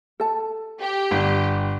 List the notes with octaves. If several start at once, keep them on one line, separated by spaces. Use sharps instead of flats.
A4 A5
G4
G1